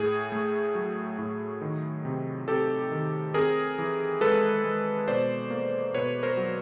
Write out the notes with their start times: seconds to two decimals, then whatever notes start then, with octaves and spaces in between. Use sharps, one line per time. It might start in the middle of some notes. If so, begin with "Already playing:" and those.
Already playing: A2 G#4
0.32 A3
0.75 F#3
1.18 A2
1.62 D#3
2.05 C3
2.48 C3 G4 A4
2.92 D#3
3.34 C4 G#4 A#4
3.79 E3
4.21 G#3 A4 B4
4.64 G#3
5.08 B2 C5 D5
5.51 A#3
5.94 B2 B4 C#5
6.23 A#4 C5
6.37 F#3